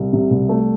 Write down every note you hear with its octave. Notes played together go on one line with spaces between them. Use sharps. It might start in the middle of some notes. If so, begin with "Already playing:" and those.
Already playing: C2
C3
C2
A3